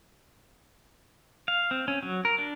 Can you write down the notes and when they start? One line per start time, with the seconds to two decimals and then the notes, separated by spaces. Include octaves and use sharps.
1.48 F5
1.71 C4
1.88 C#4
2.03 F#3
2.25 A#4
2.38 D4